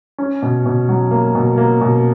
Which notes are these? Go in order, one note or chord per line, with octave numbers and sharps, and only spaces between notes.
C#4
B2
B2
F#3
A#3
B2
A#3
B2